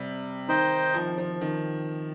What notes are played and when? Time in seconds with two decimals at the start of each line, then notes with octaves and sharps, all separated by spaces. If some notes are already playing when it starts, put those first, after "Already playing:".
Already playing: C3 G3
0.48 D#3 D#4 C5 D#5 G5
0.94 F3
1.18 F3
1.41 D#3